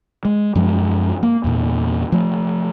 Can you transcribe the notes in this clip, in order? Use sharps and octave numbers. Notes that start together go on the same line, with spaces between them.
G#3
F#2 F3 G#3
A#3
E2 A#2
F3 A3